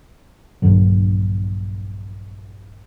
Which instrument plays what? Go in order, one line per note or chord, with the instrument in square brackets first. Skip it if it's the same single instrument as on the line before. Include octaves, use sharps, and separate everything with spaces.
[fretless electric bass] A#1 G2 D3 F#3